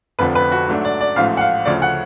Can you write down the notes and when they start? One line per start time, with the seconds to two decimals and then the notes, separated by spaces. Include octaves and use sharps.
0.19 F1 F2 D3 F3 B4
0.35 B4
0.52 F#4
0.68 G#2 F#3 A3 D4
0.85 D5
1.01 D5
1.16 A1 G#2 F3 A3 F5
1.37 F#5
1.41 F5
1.65 D2 C#3 F3 A3 D5
1.82 F#5